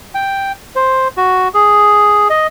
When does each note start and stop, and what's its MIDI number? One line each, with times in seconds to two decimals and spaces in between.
0.15 0.52 79
0.76 1.08 72
1.17 1.48 66
1.54 2.28 68
2.30 2.47 75